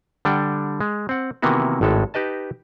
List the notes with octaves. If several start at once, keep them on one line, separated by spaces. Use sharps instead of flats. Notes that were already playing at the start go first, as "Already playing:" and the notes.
D3 G3 D4 F#5 G5
G#3
C4 F#5
C3 D#3 E3 A#3 B3 F#4
G#1 A2 G#3 A4
D#4 G4 B4 D#5 A5